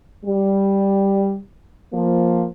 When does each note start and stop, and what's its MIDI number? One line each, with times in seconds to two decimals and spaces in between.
0.25 1.36 55
1.93 2.45 53
1.93 2.45 58